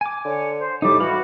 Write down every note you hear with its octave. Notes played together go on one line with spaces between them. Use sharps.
G#5 D6
D3 C#5
C5
A2 G3 D#4 D6
E3 F#4 F5 B5